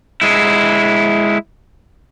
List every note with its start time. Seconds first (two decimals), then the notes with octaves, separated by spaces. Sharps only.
0.21 G#3 E4